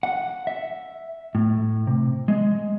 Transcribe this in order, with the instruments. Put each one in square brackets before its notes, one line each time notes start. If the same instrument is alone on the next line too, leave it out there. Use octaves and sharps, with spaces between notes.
[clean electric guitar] F#5
E5
A2
C3
G#3